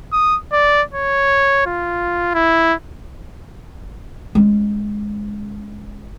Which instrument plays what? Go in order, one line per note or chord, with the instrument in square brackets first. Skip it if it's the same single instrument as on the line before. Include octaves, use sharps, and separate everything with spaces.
[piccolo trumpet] D#6
D5
C#5
F4
E4
[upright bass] G#3 C#4